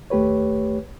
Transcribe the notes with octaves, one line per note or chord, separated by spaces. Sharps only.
D#2 A3 G4 B4 C#5